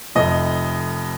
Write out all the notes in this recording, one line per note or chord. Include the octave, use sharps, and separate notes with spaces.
F1 F2 C3 D#5